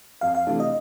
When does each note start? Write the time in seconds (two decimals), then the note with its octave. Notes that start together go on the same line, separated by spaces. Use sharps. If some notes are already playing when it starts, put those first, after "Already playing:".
0.21 F2 F5
0.35 F5
0.47 C3 E3 A3 D4
0.60 D#5